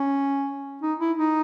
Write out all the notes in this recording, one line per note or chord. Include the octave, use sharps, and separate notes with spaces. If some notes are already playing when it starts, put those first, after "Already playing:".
Already playing: C#4
D#4
E4
D#4